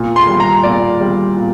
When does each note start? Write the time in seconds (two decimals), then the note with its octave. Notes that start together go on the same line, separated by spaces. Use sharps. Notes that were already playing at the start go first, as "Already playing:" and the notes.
Already playing: A#2
0.16 C6
0.28 G3
0.40 A#5
0.63 A#2 D5
1.00 G3
1.36 A#2